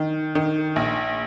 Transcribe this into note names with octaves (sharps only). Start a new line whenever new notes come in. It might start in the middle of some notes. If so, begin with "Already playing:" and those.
Already playing: D#3
D#3
A#1